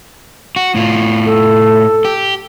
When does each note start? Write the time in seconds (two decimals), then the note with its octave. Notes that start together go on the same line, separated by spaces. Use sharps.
0.56 F#4
0.75 A2 F4
1.25 A4
2.05 G4